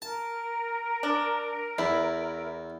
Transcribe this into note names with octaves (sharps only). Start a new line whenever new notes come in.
A#4 A5
D4
E2 E4